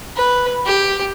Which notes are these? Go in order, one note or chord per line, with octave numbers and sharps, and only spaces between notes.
B4
G4